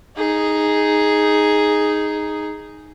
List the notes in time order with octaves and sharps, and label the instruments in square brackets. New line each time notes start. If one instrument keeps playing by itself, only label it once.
[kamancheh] D#4 G#4